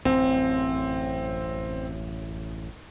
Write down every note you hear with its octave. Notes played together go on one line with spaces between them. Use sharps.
A1 F#2 C4